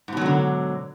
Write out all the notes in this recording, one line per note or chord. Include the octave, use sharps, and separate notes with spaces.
G#2 B2 D3 D#3 F#3